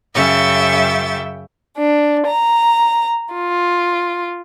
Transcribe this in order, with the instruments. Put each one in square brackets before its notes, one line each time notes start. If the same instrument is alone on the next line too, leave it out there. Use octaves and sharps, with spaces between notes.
[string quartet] F#2 C#3 E5 G5 C#6 A6
D4
A#5
F4